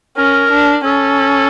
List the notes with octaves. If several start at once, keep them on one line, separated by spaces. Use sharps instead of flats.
C#4 A#4
D4
C#4 A4